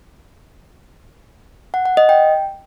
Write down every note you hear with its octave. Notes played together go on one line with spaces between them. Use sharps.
F#5
F#5
D#5
G5